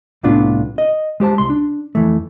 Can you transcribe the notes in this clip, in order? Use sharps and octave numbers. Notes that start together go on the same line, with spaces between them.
C2 A2 B3 D4 F4
D#5
G#3 G4 C5 A5
C2 C6
D4
F2 E3 A3